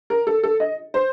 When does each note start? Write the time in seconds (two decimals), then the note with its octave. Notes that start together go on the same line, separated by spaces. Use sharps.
0.10 A#4
0.27 A4
0.43 A4
0.60 D#5
0.94 C5